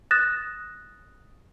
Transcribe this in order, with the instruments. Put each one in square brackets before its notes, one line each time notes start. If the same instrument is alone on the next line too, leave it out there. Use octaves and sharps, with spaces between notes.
[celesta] D#6 F#6 A6 A#6 E7